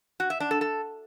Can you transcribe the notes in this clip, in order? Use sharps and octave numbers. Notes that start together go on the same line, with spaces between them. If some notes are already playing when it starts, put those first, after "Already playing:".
F#4
E5
D4
A4
A4